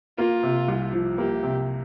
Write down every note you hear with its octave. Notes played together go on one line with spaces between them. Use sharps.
A#3 F4
C3
C2
F3
A#3 G4
C3